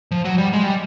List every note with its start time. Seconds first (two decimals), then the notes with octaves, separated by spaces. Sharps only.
0.11 F3
0.25 F#3
0.38 G3
0.53 G#3
0.63 G3